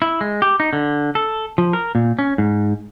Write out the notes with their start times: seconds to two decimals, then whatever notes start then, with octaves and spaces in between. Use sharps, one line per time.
0.02 E4
0.21 G#3
0.42 G4
0.60 D#4
0.73 D3
1.15 A4
1.58 F3
1.73 A#4
1.95 A#2
2.19 C#4
2.38 G#2